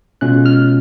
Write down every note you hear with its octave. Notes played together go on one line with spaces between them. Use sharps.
B2 G#3 C#4 F4 F#6
F6